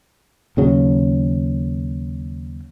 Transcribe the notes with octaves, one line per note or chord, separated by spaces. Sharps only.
D#2 C#3 F#3